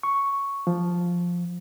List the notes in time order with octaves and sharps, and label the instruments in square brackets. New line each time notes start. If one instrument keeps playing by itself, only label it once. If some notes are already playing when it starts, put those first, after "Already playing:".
[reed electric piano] C#6
F3